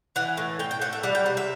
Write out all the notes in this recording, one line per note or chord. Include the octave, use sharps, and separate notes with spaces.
E3 F#5
A2
A2 G5
G5
A2 F#5
E5
G3 F#5
G5
C3 F#5
E5